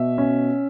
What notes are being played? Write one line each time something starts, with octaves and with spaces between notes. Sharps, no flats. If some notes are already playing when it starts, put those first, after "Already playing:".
Already playing: B2 E5
C#4